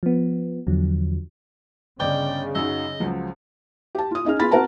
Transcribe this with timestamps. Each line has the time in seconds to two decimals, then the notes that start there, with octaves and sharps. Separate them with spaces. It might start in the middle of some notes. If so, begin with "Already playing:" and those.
0.03 F3 B3
0.67 E2 D3 F3 F#3
2.00 G1 C#3 D5 D#5 G5 D6 G6
2.55 F#2 F#3 D#4 D#5 E6
3.00 C#2 F3 F#3
3.95 G4 A5
4.11 F4 D#6
4.25 C#4 D#4 G#4 F6
4.39 B3 F4 G#4 B5 A6
4.51 C4 F#4 A#4 F#5 A5 A#5